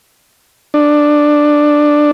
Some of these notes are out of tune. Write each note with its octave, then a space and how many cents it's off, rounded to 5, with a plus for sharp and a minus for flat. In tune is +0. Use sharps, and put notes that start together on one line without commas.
D4 +10